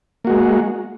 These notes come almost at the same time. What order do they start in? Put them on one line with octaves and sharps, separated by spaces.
A#3 F#4 G#3